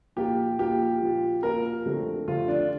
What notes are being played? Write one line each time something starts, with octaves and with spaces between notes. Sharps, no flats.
A#2 F3 A#3 F4 G4
A#2 F3 A#3 F4 G4
A#2 F3 A#3 F4
A#2 F3 A#3 F4 A#4
F2 D3 A3 C4 G4
F2 D3 A3 C4 F4 G4
D4